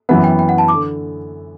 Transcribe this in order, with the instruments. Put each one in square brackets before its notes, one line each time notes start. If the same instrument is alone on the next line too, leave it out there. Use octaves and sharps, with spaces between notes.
[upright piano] F#2 E3 B3 [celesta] F#5
[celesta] G5
G5
F#5
A5
[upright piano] D3 [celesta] D6